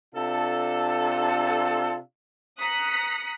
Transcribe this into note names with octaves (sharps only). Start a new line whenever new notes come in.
C3 D4 F4 A4
A#5 D#6 F#6 B6 C#7